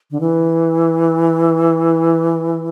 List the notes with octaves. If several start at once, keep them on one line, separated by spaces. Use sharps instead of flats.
D3
E3